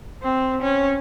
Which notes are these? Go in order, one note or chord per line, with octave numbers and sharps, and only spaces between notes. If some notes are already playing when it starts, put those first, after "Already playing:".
C4
C#4